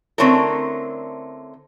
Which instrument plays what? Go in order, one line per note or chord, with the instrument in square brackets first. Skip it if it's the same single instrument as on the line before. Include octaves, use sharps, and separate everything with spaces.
[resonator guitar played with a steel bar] D3 A3 C4 C#4 E4 A#4